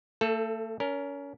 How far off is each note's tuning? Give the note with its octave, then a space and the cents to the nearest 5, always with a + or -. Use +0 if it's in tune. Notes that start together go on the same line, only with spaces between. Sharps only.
A3 +35 A4 +0
C#4 +30 A#4 +0